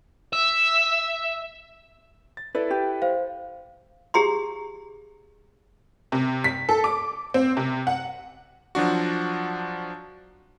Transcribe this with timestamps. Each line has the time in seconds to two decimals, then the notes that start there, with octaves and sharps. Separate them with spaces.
0.33 E5
2.37 A6
2.55 E4 A4 B4 D5
2.70 G4
3.02 C5 F5
4.14 G4 G#4 A#5 C6
6.12 C3
6.44 B6
6.69 A4
6.84 D6
7.34 C4
7.57 C3
7.87 F#5
8.75 F3 F#3 D4 F#4